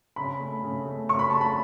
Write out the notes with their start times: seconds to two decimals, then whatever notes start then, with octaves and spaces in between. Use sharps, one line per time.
0.16 C#3 B5
0.40 A3
0.63 C#3
0.86 A3
1.09 C#3 C#6
1.19 B5
1.30 A3 A5
1.41 B5